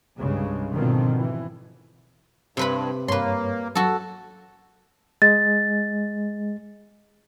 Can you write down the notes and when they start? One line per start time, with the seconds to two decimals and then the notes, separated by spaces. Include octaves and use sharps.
0.18 C2 G2 C#3 G#3
0.73 G#1 B2 D3 D#3 F3 C4
1.16 E3
2.57 G2 C3 B4 B5
3.08 G2 A#3 B4 C#5 C6
3.75 F#3 F#4 A4
5.22 G#3 A6